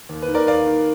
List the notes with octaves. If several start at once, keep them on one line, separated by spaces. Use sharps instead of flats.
D#2
B4
D#3
A#4 D5
D#2 D5 F5
D#3